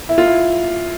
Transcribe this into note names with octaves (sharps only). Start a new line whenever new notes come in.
E4
F4
E4